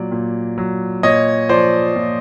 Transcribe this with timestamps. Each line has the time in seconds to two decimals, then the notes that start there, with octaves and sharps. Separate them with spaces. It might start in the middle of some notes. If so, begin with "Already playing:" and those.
Already playing: A#2 F#3 D5
0.12 A#2
0.58 F#3
1.03 A#2 C#5 D#5
1.49 F3 C5 D5
1.96 A#2